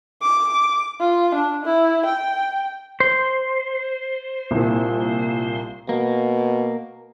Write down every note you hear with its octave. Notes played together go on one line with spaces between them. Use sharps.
D6
F4
D4
E4
G5
C5
C2 A#2
B2 A#3